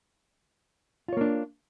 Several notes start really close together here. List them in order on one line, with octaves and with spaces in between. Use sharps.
F4 C#5 A#3 D4